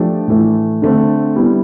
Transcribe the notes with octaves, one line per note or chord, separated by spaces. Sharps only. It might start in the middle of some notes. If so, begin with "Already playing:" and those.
Already playing: F3 A3 D4 G4
A2 E3 A3
D3 A3 C4
G3 B3 E4